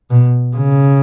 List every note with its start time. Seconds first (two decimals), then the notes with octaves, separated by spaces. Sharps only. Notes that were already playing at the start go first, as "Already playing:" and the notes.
0.11 B2
0.56 C#3